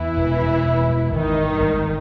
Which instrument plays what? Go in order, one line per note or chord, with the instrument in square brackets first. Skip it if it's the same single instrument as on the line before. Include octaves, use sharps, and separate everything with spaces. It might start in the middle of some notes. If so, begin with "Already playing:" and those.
Already playing: [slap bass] E2 [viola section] E3 E4
[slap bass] E1
C3
E1
E2
[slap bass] G#1 [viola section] D#3 D#4
[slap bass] G2
G#1
D3